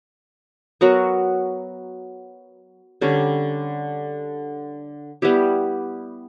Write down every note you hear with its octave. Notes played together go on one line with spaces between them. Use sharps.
F#3 B3 F#4 A#4
D3 G3 C#4
G3 B3 E4 G4